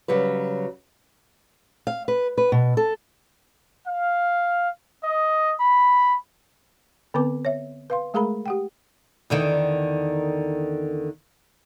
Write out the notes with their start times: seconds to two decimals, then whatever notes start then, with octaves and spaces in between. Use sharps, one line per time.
0.08 C#3 F#3 G3 B4
1.87 F5
2.08 B4
2.38 B4
2.52 B2
2.77 A4
3.87 F5
5.04 D#5
5.60 B5
7.14 D3 B3 C4 B4 D6
7.45 C#5 E5
7.90 B4 F5 C6
8.14 G#3 A3 G#4 A#4 A#5 B5
8.46 G4 F#5 G5
9.30 E2 D3 D#3